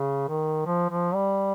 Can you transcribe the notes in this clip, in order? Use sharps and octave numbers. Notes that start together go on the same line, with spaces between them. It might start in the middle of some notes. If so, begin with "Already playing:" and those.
Already playing: C#3
D#3
F3
F3
G3